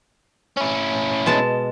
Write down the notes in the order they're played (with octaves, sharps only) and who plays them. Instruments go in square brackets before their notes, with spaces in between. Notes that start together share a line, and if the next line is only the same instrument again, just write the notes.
[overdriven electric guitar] C#4 E4
[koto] B2 G#3 A5